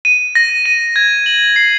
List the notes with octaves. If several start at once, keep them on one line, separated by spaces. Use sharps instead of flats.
D#7
A#6
D#7
G#6
F#7
C7